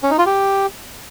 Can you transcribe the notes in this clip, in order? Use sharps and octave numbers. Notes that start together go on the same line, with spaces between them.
C#4
D#4
F4
G4